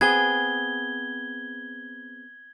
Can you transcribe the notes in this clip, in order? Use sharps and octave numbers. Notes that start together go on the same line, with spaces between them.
B3 C4 G#4 G#6 G7